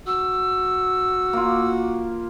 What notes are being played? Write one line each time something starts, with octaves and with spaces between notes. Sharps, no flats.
F#4 E6
A#3 F4